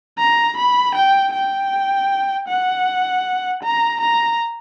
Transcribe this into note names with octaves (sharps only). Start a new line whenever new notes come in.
A#5
B5
G5
G5
F#5
A#5
A#5